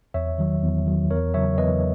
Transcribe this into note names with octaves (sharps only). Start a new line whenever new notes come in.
E2 C#5 E5
D#3 F#3
E2
D#3 F#3
E2 A#4 C#5
C#3 F#3 C#5 E5
E2 B4 D#5